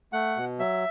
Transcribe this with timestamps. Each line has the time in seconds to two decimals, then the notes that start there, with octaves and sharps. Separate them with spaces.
0.13 A3 F#5
0.36 B2
0.59 F#3 E5